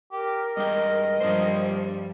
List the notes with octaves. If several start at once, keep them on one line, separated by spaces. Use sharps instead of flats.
G4 A#4
G2 G#3 D#5 G5
G2 F3 G3 D4 C5